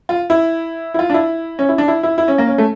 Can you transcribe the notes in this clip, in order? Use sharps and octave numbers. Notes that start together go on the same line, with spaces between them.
F4
E4
E4
F4
D4
E4
C#4
E4
D4
E4
E4
E4
C#4
A#3
C#4
A3